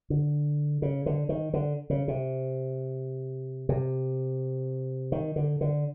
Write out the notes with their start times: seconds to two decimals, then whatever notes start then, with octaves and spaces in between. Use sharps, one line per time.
0.10 D3
0.82 C#3
1.06 D3
1.29 D#3
1.54 D3
1.90 C#3
2.08 C3
3.69 C3
5.12 D#3
5.36 D3
5.61 D3